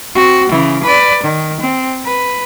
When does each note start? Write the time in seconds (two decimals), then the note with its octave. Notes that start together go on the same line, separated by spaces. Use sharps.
0.15 C4 F#4
0.50 C#3 E3
0.83 B4 D5
1.23 D#3
1.60 C4
2.05 B4